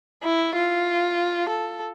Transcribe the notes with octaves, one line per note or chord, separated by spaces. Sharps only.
E4
F4
A4